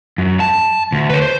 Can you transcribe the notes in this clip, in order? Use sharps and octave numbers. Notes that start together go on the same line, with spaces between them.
F#2
A5
D2
B4 C#5
C5